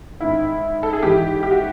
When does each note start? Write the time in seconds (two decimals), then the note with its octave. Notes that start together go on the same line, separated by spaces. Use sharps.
0.20 G#2 D#3 E4
0.83 A4
0.93 G#4
1.03 G#2 E3 G4
1.43 G4
1.51 F#4